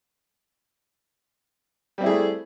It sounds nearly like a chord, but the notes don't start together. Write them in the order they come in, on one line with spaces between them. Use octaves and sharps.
G3 C4 E4 G#4 A3